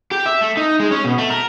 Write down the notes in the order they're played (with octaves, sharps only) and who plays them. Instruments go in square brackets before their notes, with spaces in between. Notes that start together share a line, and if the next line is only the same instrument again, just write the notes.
[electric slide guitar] G4
E5
A3
D#4
G#3
C#4
B2
A3
A#4